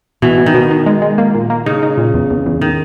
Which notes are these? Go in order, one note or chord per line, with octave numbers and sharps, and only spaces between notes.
B2 E3
B2
D#3
B2
D#4
G#3
G#3
A#3
A#2
A#3
C#3 D#4
D#4
A#2
E2
E2
E2
D#3